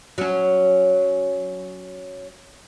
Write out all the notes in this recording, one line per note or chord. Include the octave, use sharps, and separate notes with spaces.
F#3 C#4